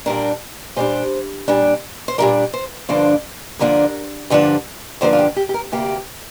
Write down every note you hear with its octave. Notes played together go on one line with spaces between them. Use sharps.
A#2 G3 D4 A#4
A#2 G3 D4 C5
A#2 G3 D4
C5
A#2 G3 D4 A#4
C5
G2 D3 F3 A#3 D4 C5
G2 D3 F3 A#3 D4 A#4
G2 D3 F3 A#3 D4
G2 D3 F3 A#3 D4 C5
F4
G4
G4
G4
A#4
D2 C3 A#3 G4